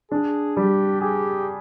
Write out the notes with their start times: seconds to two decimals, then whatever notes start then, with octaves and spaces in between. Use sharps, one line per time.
0.12 D4 G#4
0.56 G3 G4
1.01 G4 G#4